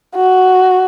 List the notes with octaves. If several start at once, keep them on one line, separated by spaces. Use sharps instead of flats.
F#4